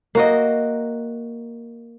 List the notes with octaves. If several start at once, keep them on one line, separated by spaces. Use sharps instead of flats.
A#3 F#4 D#5